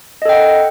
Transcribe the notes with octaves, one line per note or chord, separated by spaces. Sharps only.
A4 D#5 F#5 G5